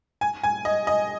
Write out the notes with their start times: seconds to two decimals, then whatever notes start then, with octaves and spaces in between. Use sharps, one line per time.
0.21 G#5
0.43 G#5
0.65 D#5
0.87 D#5